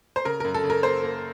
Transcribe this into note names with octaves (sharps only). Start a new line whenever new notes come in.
C5
C#3 A#4
F#2 A#4
A4
C#3
A#4
A#3 C5
A#3